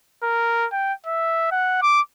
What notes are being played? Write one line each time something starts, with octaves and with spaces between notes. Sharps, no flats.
A#4
G5
E5
F#5
D6